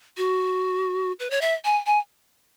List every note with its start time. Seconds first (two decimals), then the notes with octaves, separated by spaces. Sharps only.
0.17 F#4
1.20 B4
1.30 C#5
1.41 E5
1.65 G#5
1.86 G#5